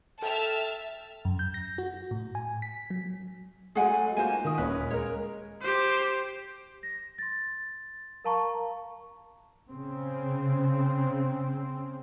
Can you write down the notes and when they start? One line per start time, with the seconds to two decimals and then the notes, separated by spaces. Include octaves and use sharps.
0.22 A4 E5 G5 A5 F6
1.25 F#2
1.39 G6
1.54 A#6
1.78 F#4
2.11 A2
2.35 G#5
2.62 B6
2.90 F#3
3.75 F#3 G#3 A3 G#4 F#5 G#5
4.17 A#3 F4 F#4 C5 G#5
4.30 D#4
4.45 D#3 D#6
4.58 D#1 A#3 C#4 B4
4.90 G#3 A#4 C#5
5.61 G4 C5
6.83 A#6
7.18 C6 A6
8.25 A#4 F5 A5 A#5 C#6
9.69 C#3 C4